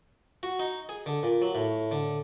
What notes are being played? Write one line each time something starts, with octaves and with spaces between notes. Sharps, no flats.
F#4
D#4
G#4
D3
A#2
F#3
A2
D3